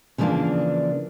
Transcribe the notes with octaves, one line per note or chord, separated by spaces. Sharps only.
C#3 E3 F3 A#3 D4